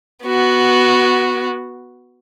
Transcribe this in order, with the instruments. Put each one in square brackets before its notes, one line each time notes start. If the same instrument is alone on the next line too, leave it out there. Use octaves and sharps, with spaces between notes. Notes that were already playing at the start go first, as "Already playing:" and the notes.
[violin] B3 F#4